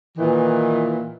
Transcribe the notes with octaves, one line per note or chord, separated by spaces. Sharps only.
A#2 D#3 E3